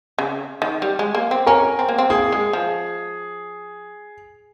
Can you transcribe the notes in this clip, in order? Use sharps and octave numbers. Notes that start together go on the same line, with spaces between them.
C#3
D#3
G3
G#3
A#3
C4
C#4 A#4
C4
A#3
C4
A#3 G#4
G#3
F3